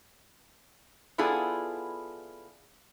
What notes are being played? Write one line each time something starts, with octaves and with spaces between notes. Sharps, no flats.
B3 E4 F4 G#4 A4 D5